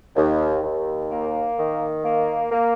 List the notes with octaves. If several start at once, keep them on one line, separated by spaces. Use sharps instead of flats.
D#2
D#2
A#3
D#3
A#3
A#3